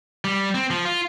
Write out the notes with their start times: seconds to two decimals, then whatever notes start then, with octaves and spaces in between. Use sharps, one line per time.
0.25 G3
0.55 C4
0.70 F3
0.85 F4